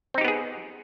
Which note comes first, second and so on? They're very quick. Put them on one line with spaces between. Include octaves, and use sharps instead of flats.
C4 D#4 G4 B3 G#4